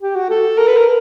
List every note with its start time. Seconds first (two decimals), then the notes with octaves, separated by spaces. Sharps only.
0.01 G4
0.15 F#4
0.30 A4
0.58 A#4
0.67 B4
0.77 A#4